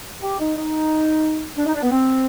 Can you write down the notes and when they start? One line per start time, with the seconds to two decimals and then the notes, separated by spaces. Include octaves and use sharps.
0.22 G4
0.39 D#4
0.57 D#4
1.57 D4
1.66 D#4
1.75 D4
1.83 B3
1.92 C4